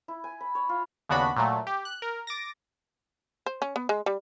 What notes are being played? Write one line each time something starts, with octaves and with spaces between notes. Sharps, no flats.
E4
G#5
B5
C#5
F4
D#2 C#3 B3 D4 F#4 B5
A#2 F#3 A3
G4
F#6
A#4
D6 A6 A#6
C5
C#4
B3
G#3
G3